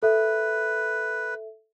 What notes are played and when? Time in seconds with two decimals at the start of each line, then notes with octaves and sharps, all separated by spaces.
0.03 A4 B4 E5